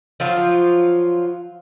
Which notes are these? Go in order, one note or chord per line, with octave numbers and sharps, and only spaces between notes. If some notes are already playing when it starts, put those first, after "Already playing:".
F3 F#3 F4